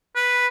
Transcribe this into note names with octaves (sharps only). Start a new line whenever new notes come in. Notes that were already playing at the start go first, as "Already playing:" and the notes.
B4